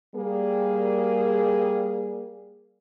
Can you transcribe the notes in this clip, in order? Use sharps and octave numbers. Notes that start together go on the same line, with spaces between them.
G3 A#3 G#4